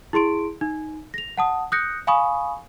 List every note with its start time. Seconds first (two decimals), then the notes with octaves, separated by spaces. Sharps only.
0.13 E4 G#4 C6 D7
0.61 D#4
1.14 A#6 F7
1.37 F#5 A5 D#6
1.72 D#6 F#6 G6 A#6 C#7
2.07 F5 G#5 B5 C#6 D#6